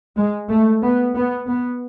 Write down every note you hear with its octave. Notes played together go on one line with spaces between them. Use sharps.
G#3
A3
B3
B3
B3